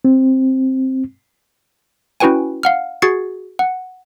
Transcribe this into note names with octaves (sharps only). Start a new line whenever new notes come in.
C4
C#4 E4 F#4 B4 G5 G#5
F5 F#5 F6
F#4 G#4 G#6 A6 C7 C#7
F#5